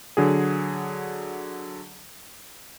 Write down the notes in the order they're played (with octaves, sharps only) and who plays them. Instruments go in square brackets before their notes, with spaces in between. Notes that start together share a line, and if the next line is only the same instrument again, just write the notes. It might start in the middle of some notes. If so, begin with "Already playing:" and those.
[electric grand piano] D3 F#3 G#4